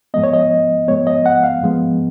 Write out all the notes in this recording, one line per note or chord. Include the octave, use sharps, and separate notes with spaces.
G#2 F3 G#3 B3 D#5
C#5
D#5
G#2 F3 G#3 B3 C#5
D#5
F#5
F5
G#2 F3 G#3 B3